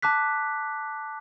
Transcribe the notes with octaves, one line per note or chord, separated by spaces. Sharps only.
A5 D6 F#6 B6